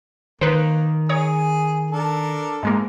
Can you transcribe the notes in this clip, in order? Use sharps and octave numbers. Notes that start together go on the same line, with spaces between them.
D#3 A#3 B4 C5
G#4 C#5 A#5 D#6
D4 A4 A#4
G#2 G#3 A#3